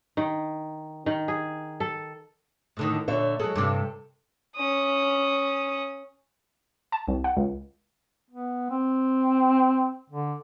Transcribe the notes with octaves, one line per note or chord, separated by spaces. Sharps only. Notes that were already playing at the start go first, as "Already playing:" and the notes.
D#3
D#3
G#4
A4
A2 D3 D#3
A#2 D3 C#5 E5
F#3 G#3 A4
G2 C3
C#4 D#6
A5
C2
F#5
C#2
B3
C4
D3